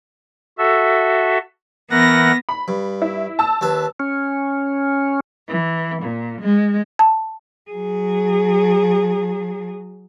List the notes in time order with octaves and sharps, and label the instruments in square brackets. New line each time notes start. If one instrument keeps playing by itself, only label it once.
[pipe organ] F#4 A4 E5
[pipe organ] E3 A#4 F#5 [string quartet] B3 A#6
[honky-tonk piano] B5
[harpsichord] G2
[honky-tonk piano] E4
A5 E6
[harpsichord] D#2 B4
[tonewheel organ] C#4
[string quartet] E3
A#2
G#3
[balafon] A5
[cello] F#3 G#4